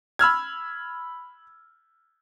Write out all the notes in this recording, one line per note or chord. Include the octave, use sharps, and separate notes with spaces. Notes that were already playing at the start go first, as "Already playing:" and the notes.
B5 E6 F6 G#6